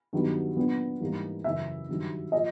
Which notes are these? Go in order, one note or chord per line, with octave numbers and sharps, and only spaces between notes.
G2 D#3 F#3 B3
A#2 F#3 B3 D4
G#2 E3 G3 A#3
F#2 C#3 E3 E5
G2 D#3 F#3
F3 A#3 D#5